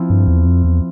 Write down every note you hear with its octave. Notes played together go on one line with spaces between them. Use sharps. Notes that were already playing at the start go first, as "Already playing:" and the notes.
Already playing: F3 C4 E4
G2
E2
F2
E2